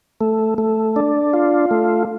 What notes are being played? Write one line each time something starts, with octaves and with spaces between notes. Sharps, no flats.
A3
A3
D4
F4
A3